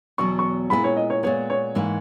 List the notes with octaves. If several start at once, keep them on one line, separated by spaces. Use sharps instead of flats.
E2 B2 F#3 C#6
C#6
A#2 G#3 B3 E4 B5
C#5
D#5
C#5
A#2 G#3 B3 C#5
C#5
G#2 E3 A#3 E4